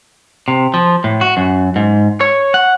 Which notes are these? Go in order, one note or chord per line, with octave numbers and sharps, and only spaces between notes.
C3
F3
A2
F#4
F#2
G#2
C#5
F#5